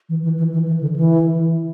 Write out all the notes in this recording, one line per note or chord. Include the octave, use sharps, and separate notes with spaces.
E3
E3
E3
E3
E3
D3
E3